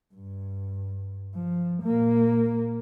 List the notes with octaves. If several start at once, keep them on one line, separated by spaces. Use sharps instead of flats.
G2
F3
A#2 A#3